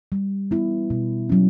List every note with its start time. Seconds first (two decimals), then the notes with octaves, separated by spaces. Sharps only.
0.12 G3
0.51 B3 E4
0.90 B2
1.29 F#3 C#4